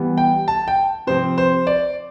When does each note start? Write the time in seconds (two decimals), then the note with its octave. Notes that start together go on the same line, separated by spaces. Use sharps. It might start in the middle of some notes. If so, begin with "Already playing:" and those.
Already playing: E3 G3 B3
0.18 G5
0.48 A5
0.68 G5
1.07 C3 F3 C4 C5
1.38 C5
1.67 D5